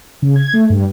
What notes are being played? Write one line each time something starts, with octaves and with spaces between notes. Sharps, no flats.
C#3
G#6
A3
G2